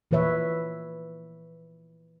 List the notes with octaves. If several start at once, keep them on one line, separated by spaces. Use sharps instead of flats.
A#2 E3 F3 B4 C#5 E5